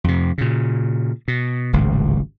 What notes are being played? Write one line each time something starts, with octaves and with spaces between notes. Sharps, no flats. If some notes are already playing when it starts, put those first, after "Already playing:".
F2 C3
A#2 C#3
B2
D1 G#1 C#2